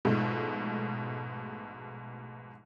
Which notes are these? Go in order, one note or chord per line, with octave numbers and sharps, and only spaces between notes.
A#1 G#2 B2 G#3 A3